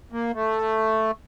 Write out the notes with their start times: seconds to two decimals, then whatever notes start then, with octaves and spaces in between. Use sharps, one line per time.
0.12 A#3
0.34 A3